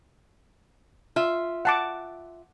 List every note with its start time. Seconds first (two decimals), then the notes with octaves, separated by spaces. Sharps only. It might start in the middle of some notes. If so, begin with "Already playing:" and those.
1.16 F4 E5
1.65 F#5 A5 D6